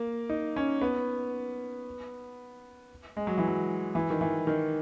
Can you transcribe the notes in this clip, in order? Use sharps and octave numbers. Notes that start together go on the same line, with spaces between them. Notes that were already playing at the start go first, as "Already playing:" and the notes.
Already playing: A#3
D#4
C#4
B3
G#3
F#3
E3
F#3
E3
D#3
E3
D#3